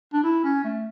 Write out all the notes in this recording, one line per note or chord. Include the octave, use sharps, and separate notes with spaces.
D4
E4
C#4
A3